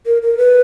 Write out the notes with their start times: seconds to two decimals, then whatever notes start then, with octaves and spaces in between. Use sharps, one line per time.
0.06 A#4
0.22 A#4
0.38 B4